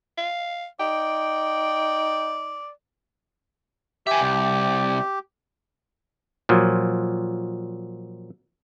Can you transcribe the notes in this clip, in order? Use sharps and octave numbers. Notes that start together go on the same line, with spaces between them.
F5
D#4 D5 G5
G4 E5 G#5
C2
A#2 F3 F#3